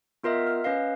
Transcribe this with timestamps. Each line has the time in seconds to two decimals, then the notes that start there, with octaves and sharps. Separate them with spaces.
0.23 B3 F4 A#4 D#5 E5
0.47 F6
0.64 C#4 B4 D#5 F5